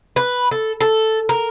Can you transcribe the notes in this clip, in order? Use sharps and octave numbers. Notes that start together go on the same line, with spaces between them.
B4
A4
A4
A#4